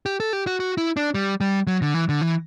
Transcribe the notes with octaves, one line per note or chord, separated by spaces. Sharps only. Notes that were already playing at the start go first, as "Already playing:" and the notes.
G4
A4
G4
F#4
F#4
E4
D4
G3
G3
F#3
D3
E3
D3
E3